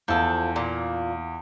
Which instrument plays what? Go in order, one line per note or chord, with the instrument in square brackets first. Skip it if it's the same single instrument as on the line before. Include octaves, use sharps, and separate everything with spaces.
[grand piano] E2 [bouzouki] F3 A4
[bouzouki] A#2